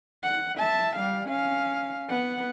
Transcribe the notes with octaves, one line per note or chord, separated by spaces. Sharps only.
F#5
E5 A5
G3 F5
C#4 F5
B3 F#5